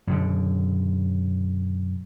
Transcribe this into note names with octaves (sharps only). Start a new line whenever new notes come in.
F#2 B2 D3